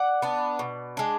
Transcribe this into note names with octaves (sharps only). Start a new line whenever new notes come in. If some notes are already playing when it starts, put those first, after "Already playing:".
Already playing: D5 F#5
B3 D4
B2
G#3 D4